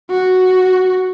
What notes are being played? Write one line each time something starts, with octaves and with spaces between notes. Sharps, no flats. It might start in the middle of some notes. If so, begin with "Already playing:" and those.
F#4